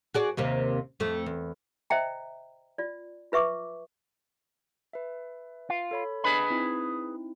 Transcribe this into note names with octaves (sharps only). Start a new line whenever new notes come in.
F#4 G#4 D5
D#2 C3 A#3
F2 A3
E2
C5 D#5 E5 G5 A#5
F4 D5
F4 B4 E5 C#6 D6
B4 E5
F4
A4 C#5 B5
D4 G#4 B4 D#5 G#5 B5
C4 D#4 E4